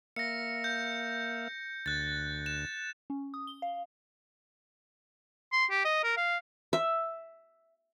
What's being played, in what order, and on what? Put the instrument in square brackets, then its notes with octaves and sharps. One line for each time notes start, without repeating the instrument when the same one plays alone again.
[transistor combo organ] A#3 E5 F5 [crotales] A#6 C#7
[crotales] G6
[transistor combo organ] D2 [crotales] F#6 A6
[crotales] E7
[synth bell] C#4
D#6
G7
F5
[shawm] C6
G4
D#5
A#4
F5
[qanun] E5